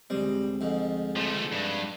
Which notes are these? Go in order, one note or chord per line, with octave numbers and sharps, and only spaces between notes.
D2 G3 G#3 C4
F2 G#2
F3 A3
G2